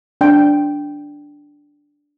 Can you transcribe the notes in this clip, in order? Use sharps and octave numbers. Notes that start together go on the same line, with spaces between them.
D4 G5